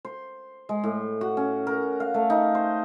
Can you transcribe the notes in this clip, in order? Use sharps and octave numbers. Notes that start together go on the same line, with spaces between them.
C5
G#3
A2
F#4
C#4
A#4
F5
A3
D#4
C5